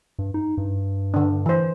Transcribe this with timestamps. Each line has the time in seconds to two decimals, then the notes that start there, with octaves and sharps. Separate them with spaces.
0.19 G2
0.34 D#4
0.58 G2
1.14 D3 D4
1.46 E3 C5